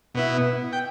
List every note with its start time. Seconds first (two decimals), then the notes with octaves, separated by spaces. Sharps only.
0.15 B2 B3 E4
0.73 G5